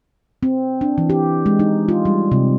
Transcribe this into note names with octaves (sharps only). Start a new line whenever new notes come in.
C4
D4
E3
G4
G#3
D#4
F4
G3
C3